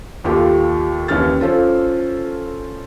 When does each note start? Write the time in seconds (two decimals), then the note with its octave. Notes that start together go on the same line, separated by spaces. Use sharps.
0.24 D#2 F4 G4 A4
1.08 D#2 E3 C#4 F6 A6
1.40 C#4 F4 A4 C5